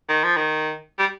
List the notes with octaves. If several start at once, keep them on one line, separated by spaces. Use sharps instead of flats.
D#3
F3
D#3
G3